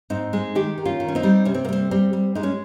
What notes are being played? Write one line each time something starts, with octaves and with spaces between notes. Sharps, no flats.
G#2 C4 D#4
G#3
D#3 D#4 G4
D#3
C#4 F4
D#3
C#4
C4 D#4
G3
C3 C#4
C4
A#3
G3 C4
G3 C4
G3
G#3 D#4
C#4